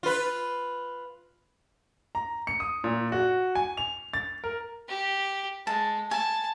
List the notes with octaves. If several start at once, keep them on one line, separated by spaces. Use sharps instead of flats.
F4 B4
A#5
C#7
D#6
A#2
F#4
G#5
F7
A6
A#4
G4
G#3 A5
G#5 A5